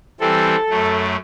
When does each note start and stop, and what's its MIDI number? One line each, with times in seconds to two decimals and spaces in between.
0.20 0.56 52
0.20 0.56 55
0.20 0.56 60
0.20 1.04 69
0.70 1.16 42
0.70 1.16 54
0.70 1.16 57